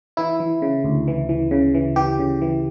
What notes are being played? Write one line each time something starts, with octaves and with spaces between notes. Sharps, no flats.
E3 E4
E3
C#3
D2
E3
E3
C#3
E3
E3 G4
C#3
E3